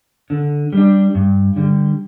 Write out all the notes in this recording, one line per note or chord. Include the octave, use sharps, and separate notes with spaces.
D3
G3 D4
G2
D3 G3